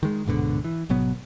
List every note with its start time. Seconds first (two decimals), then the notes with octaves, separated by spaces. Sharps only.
0.03 D#3 G#3
0.26 D1 G#2 B2 D3
0.64 E3
0.89 G#1 B2 F#3 B3